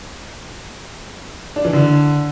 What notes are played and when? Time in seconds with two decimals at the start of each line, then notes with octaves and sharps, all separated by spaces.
1.56 D4
1.65 E3
1.73 D3